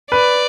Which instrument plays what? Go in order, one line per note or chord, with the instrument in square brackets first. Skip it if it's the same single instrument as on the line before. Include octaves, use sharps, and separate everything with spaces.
[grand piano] B4 [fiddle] D5